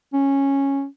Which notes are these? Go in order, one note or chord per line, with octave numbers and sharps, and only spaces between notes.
C#4